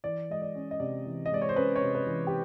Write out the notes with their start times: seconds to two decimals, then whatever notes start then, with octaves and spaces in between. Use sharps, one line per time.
0.04 E3 D5
0.30 G#3 D#5
0.42 D5
0.55 C#4
0.71 D#5
0.80 C3 D5
1.06 E3
1.26 D#5
1.31 G#3 D5
1.42 C#5
1.49 C5
1.56 C#4 B4
1.76 C#5
1.82 C3
1.95 B4
2.07 E3
2.27 G4